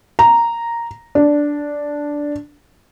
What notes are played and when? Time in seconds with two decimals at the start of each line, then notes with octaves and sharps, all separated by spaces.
0.19 A#5
1.15 D4